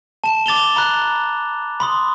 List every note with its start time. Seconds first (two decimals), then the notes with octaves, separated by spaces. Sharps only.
0.24 A5 E7
0.46 D6 A6 F7 G7
0.76 A#5 B5 F#6
1.80 B5 C6 D#6